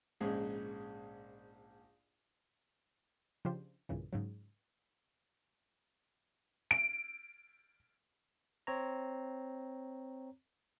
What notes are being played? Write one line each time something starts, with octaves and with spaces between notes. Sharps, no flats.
A#1 G#2 C#3 G#4
C#3 F3 D4 F4 G4 C5
B1 G2 A#2 C#3 E3
G#2 C#3 F#3
D7
C4 C#5 A#5